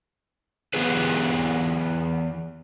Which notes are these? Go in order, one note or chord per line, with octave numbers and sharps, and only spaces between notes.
E3 B3 G4 G#4 B4